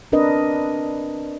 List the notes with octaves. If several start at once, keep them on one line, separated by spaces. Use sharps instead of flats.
C4 D4 A#4 B4 D#5